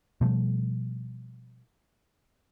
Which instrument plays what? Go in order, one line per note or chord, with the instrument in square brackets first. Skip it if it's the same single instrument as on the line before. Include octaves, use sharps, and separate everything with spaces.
[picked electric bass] B2 F3 G3 A3